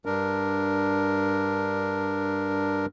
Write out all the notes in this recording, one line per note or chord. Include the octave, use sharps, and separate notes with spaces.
G2 D4 A#4